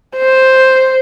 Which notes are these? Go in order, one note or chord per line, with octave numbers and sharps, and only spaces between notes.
C5